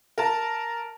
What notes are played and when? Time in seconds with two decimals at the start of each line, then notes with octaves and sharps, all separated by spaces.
0.18 A#4 A5